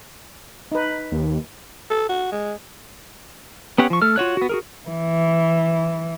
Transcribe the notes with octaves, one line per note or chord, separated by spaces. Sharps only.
D#4 B4
D#2
A4
F#4
G#3
B3 C#4 G4 C#5 F#5
F3 C#6
A3 A4 F6
F4 F#4 C#5 F#6
B3 F#4
F#4 G#4 A#4
E3